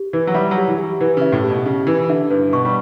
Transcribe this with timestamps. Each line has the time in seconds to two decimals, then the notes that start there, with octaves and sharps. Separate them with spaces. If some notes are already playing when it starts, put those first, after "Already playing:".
Already playing: G4
0.13 E3 B4
0.27 F#3
0.34 G3 E5
0.51 F#3
0.57 G4
0.68 E3
0.78 G4
1.01 E3 B4
1.17 C#3 E5
1.32 A2
1.44 G4
1.50 B2
1.66 C#3 G4
1.87 E3 B4
2.09 D3 E5
2.30 G2 B4
2.53 B2 C#6
2.65 G3